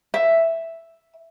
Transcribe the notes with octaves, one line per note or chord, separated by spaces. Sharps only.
E5